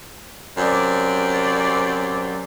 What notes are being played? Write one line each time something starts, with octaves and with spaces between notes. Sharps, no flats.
F#2 C3 C4 D5